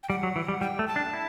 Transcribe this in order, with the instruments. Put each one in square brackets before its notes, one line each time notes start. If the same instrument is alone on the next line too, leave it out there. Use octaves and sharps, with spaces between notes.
[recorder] G5
[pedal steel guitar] G3 [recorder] F#5
[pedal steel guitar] F#3
E3
G3
[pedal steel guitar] G3 [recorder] G5
[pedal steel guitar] A3
[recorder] A5
[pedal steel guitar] D4
E4